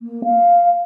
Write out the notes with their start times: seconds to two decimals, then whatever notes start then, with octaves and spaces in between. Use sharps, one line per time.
0.02 A#3
0.24 F5